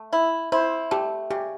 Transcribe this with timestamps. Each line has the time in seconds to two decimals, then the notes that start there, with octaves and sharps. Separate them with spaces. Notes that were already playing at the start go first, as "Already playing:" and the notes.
Already playing: A3
0.13 E4
0.52 E4 C5
0.91 A3 G4
1.30 C#3 G4